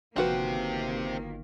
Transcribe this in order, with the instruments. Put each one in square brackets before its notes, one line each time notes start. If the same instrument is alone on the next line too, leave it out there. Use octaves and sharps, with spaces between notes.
[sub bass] G1 [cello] D#3 A#3 [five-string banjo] F3 F#4 B4 [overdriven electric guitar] C4 G4